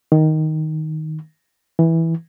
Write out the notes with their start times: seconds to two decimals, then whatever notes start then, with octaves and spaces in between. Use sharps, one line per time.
0.12 D#3
1.79 E3